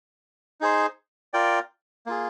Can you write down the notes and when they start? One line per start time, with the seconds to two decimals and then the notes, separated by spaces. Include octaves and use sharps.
0.61 D#4 G#4 C5
1.34 F4 A#4 D5 G5
2.06 A#3 F4 G#4